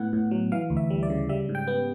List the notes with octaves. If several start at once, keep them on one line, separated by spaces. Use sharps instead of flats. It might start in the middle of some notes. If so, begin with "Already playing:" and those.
Already playing: A2 B3 F#5
A2
F#3
E3 F5
D2
E5
G3
D5
C#3
G3 E5
G#2
G5
B3